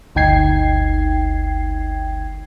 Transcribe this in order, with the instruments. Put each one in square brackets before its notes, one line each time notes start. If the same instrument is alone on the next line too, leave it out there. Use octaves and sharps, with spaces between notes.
[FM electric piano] G1 D2 D#4 G5 G#6 C7